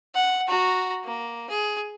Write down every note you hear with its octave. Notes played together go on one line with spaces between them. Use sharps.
F#5
F#4 A#5
A#3
G#4